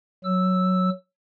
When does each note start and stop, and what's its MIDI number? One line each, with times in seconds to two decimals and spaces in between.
0.25 0.90 54
0.25 0.90 88